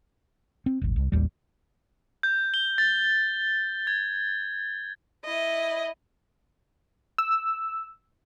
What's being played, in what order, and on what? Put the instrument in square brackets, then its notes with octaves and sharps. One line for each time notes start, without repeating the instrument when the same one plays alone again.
[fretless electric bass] C4
D#1 G#1
C2
A1 D#2 G3
[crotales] G6
G7
A6
G#6
[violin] E4 D#5
[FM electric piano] E6